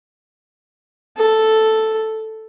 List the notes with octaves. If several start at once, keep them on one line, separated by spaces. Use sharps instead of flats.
A4